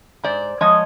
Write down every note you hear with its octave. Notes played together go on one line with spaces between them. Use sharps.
G#2 C5 D5
F3 G#3 C#5 D#5